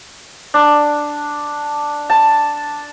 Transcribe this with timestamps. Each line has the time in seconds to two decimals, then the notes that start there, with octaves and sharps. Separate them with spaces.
0.54 D4
2.10 A5